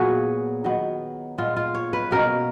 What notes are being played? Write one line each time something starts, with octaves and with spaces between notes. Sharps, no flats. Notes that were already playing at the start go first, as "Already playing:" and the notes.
Already playing: A#2 F#3 B3 F#4 G#4
D#3 F#3 B3
A#2 G#3 B3 F4
F4
C#5
B4
B2 A#3 C#4 A#4